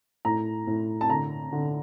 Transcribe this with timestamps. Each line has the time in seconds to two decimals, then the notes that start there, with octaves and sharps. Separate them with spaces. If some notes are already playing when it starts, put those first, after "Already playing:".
0.25 A2 A#5
0.67 A2
1.01 A5
1.10 D3 A#5
1.53 D3